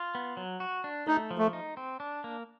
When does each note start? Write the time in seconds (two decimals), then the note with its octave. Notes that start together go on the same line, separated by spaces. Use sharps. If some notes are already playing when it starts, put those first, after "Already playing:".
Already playing: F4
0.15 B3
0.37 F#3
0.60 F#4
0.84 D4
1.07 A3 D#4
1.31 F3
1.38 A3
1.53 D#4
1.77 C4
2.00 D4
2.24 A#3